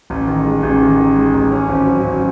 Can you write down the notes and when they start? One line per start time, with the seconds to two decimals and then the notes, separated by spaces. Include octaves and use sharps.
0.10 A1
0.27 D#3
0.45 G#3
0.63 A1
0.81 D#3
0.99 D#3
1.16 G#3
1.33 A1
1.51 C#4
1.69 G#1
1.86 F#3
2.04 G#1